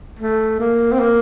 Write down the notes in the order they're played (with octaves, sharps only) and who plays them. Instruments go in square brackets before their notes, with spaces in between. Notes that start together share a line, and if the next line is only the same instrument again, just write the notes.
[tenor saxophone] A3
A#3
C4
A#3